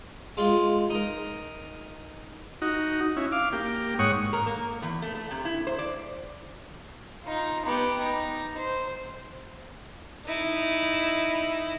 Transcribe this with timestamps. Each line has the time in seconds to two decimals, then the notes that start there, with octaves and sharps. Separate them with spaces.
0.37 G#3 F4
0.90 D#4 A#4
2.62 D#4 F#4
3.17 C#4 E4
3.32 F5 D6
3.53 A#3 G4
3.99 G#2 C#5 F#5 C#6 D#6
4.33 A#4
4.46 A#3
4.82 E2
5.02 A3
5.15 A3
5.31 C3
5.45 E4
5.67 C5
5.78 D5
7.24 D#4 F4
7.66 B3 G4
8.01 D#4
8.58 C5
10.25 D#4 E4